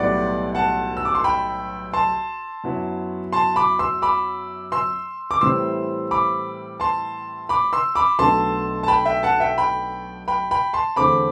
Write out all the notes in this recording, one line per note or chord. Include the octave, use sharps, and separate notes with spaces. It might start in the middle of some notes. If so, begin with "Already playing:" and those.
Already playing: B1 A2 G3 B3 D5 F#5
F#5 A5
E6
D6
C6
G5 B5
A5 C6
F#2 F#3 B3 E4
A5 C6
B5 D6
C6 E6
B5 D6
C6 E6
D6
A2 E3 G3 C4 C6 E6
B5 D6
A5 C6
B5 D6
C6 E6
B5 D6
B1 B2 A3 D4 A5 C6
A5
G5 B5
E5 G5
F#5 A5
E5 G5
G5 B5
G5 B5
G5 B5
A5 C6
E2 D3 A3 C4 B5 D6